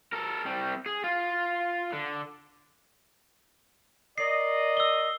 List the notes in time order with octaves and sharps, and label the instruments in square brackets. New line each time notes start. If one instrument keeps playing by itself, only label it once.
[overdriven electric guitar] A4 A#4
G3 C4
G#4
F4
D3
[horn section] A#4 D5 D#5 [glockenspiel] C7
[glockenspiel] E6 G7